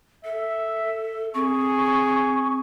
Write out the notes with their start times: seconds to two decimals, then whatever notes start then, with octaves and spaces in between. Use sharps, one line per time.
0.25 A4 E5
1.34 C4 G#4 C#6